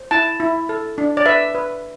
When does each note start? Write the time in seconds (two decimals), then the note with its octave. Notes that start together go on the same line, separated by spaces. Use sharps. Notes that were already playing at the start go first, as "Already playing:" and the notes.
Already playing: C5
0.11 E4 A5
0.40 E4
0.69 A4
0.98 D4
1.17 D5
1.26 B4 E5
1.55 B4